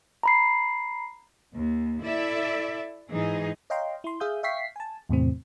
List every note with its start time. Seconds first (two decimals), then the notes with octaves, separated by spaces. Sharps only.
0.23 A#5 B5 C7
1.53 D#2
2.03 E4 A4 D5 E5
3.11 G#2 E3 D#4 G#4
3.70 C#5 D#5 F5 G5 A#5 C6
4.04 E4 C6
4.20 G#4 E5 F5 D#6 G6
4.43 E5 F5 G5 C#6 B6 C7
4.76 G#5 A5
5.09 E2 A2 C3 C4